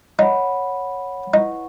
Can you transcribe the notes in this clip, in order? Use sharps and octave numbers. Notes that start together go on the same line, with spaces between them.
D#4 C#5 F#5 B5
D#4 E4 B4 F#5 C#6